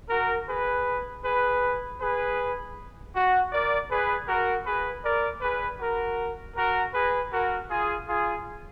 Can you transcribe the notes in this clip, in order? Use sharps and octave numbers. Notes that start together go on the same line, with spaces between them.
F#4 A#4
G#4 B4
G#4 B4
G#4 B4
F#4
A#4 D5
G#4 B4
F#4 A#4
G#4 B4
A#4 D5
G#4 B4
F#4 A#4
F#4 A#4
G#4 B4
F#4 A#4
F4 G#4
F4 G#4